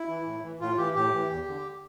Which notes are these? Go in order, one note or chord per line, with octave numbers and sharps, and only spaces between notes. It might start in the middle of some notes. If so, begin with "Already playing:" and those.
Already playing: E4
E3
A2
E3
A2 F4
E3 G4
A2 G4
E3
E2
D3